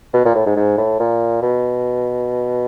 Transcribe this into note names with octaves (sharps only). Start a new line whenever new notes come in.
B2
A#2
A2
G#2
G#2
A2
A#2
B2